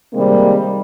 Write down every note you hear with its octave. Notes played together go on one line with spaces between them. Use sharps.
C3 D#3 G3 G#3 A#3 C4